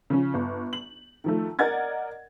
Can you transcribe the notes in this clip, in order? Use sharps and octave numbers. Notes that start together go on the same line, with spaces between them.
C#3 F3 C#4
G1
F#7
D#3 F3 A3
A#4 D5 D#5 F#5 G#6 A6